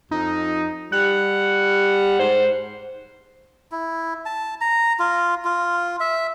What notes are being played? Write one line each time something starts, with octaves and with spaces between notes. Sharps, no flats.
F2 D#4
G3 F#5
G#2 C5
E4
A5
A#5
F4
F4
E5